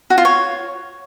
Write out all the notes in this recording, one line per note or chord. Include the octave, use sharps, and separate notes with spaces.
F#4
F4
C#5